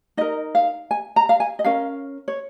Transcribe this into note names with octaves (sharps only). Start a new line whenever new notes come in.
D#4 A#4 D#5
F5
G#5
A#5
F5
G#5
D#5
C#4 A#4 F5
C#5